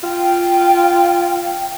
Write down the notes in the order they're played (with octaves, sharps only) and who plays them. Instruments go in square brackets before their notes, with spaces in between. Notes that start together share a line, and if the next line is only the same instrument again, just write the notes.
[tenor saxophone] F4 [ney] G5